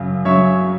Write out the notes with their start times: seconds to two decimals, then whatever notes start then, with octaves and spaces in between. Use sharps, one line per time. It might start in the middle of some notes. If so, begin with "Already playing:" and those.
Already playing: F#2 C#3 F#3
0.25 C#3 F#3 C#5 E5